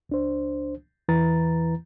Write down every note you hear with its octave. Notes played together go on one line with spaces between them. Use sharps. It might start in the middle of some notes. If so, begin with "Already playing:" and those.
C#2 D4 C5
E2 E3 E4 B4 A#5 A6